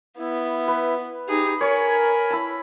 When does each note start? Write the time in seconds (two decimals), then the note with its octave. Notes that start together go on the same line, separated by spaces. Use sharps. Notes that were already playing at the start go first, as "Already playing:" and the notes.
0.18 B3 E4
0.68 B4
1.29 D#4 G4 G#4
1.61 A#4 C#5 G#5 B5 C#6
2.30 E4 A5